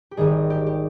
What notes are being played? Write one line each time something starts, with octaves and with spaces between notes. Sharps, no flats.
G4
G#1 G#2 D#3 G3 G#4
G4
G4